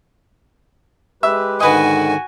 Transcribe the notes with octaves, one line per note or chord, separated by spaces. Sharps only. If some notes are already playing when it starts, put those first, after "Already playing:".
G#3 G4 B4 E5
G#2 D3 D#3 F#4 B4 D#5 G#5